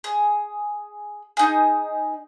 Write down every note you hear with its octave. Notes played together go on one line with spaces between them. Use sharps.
G#4
D#4 G#4